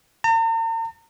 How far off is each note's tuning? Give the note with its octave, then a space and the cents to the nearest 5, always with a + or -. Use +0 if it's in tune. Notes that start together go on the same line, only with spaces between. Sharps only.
A#5 -45